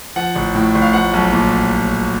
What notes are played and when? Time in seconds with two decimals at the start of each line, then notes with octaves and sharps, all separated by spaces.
0.16 F3 F#5
0.35 A1
0.55 A2
0.75 A1
0.82 F5
0.93 F3 F#5
1.13 B1
1.33 A#2